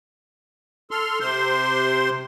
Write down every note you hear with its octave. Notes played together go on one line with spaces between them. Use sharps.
A4 C6 F6
C3 C5 C6